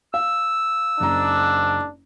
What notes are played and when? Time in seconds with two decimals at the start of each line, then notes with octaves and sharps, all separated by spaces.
0.14 F5 E6
1.00 F#1 G#2 D4 A#5